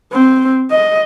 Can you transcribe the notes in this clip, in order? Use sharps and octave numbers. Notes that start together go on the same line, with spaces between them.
C4
D#5